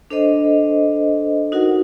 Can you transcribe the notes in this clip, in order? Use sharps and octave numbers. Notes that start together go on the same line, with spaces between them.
D4 A4 C5 D#5
D#4 F#4 A#4 F#5